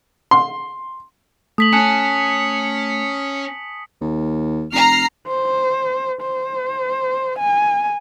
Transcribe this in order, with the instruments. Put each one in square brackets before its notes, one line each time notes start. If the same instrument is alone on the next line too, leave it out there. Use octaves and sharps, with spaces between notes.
[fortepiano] C6
[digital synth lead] A3 [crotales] D#6 B6 F#7
[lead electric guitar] C#4 C#5 [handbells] G#5 A5 F#6 [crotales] C#7
[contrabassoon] D#2
[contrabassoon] F1 [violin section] A#5 F6 C7
[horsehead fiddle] C5
C5
G#5